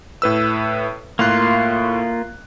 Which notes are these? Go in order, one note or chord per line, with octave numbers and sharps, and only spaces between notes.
A2 B4 E6
A2 A#3 F4 C6 F#6